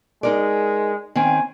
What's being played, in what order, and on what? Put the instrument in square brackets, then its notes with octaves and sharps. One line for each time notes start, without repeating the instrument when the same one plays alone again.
[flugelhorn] G#3 [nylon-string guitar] D#4 A#4 D5
[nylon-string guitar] D#3 C4 C#4 [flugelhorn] G#5